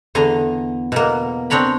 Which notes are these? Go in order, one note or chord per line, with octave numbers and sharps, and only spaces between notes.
E2 D3 G#5 A#5
B2 A#3
C4 D4 C#5 A#5 B5